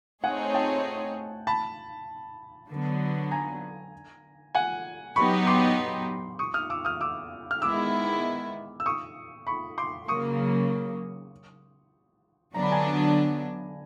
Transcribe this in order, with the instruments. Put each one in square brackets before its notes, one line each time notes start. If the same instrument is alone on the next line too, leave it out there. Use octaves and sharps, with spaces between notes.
[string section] A3 C4 D#4 G#4 C#5 [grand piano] F#5 G#5
[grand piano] G5 A5
A5 B5
[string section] D3 F#3 B3
[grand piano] G#5 A#5
F#5 G#5
[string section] F#3 B3 D#4 G4 [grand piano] B5 C#6
[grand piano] C6 D6
C#6 D#6
D#6 F6
D6 E6
D#6 F6
D6 E6
F6
[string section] D#3 G#3 B3 E4 [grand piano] D6 E6
[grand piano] E6
C#6 D#6
B5 C#6
C6 D6
[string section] C#3 F#3 A#3 [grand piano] C#6 D#6
[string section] D3 F#3 B3 D4 [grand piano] A#5
[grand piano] B5
G#5 A#5